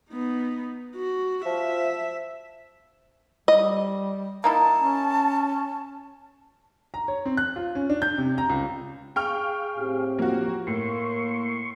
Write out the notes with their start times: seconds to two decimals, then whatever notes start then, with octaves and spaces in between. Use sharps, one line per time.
0.10 B3 D#4
0.96 F#4
1.45 F3 E5
3.48 G3 D#5
4.44 A#3 D#4 E4 A5
4.78 C#4
6.94 A#5
7.08 C#5
7.25 C4
7.37 F#6
7.56 F4
7.75 C#4
7.90 D4
8.02 G6
8.18 C3
8.38 A#5
8.50 C#2
9.16 G#4 F5 G5 C#6 F6
9.77 A2 C4 G4
10.19 F3 A#3 F#4
10.67 A2 A#3 C6 C#6